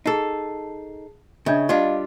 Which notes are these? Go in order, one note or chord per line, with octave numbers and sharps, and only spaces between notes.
D#4 G#4 A4 A5 C7
C#3 D4 D#5 E5
G3 D4 F4 D#5 F5